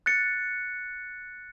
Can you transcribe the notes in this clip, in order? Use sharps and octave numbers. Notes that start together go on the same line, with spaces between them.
F#6 A6 C#7